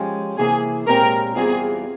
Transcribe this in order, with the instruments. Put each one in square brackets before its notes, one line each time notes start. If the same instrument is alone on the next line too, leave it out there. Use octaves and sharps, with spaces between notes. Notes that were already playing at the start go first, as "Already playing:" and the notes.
Already playing: [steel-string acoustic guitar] F3 G#3 C#4 G4
[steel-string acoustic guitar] C3 E3 A#3 E4 [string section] G#4
[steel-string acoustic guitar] A#2 G#3 C4 G4 C#5 [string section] A#4
[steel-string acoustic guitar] E2 E3 G3 C4 F4 [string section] G#4